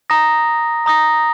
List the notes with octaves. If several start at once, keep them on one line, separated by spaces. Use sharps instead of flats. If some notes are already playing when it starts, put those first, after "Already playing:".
A#5 D#6 A#6
A#5 D#6 A#6